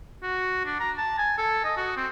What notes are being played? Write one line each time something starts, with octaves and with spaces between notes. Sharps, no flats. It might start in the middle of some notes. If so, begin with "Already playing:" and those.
F#4
D4
A#5
A5
G#5
A4
D#5
F#4
C4